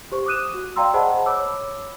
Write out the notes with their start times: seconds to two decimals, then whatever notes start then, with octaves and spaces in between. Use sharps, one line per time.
0.12 G4 C5 C#6
0.26 D6 D#6 F#6 D#7 E7
0.54 F#4
0.76 D5 F5 G5 A#5 C6 E6
0.94 G#4 C5 D#5 F#5 A5 B5
1.26 C#5 B5 D6 E6